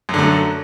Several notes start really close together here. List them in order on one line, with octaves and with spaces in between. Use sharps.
F#2 D3 A3 F#3